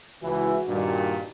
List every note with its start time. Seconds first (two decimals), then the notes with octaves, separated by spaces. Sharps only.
0.22 C#2 E3 F#4
0.68 G2 A#2 D#3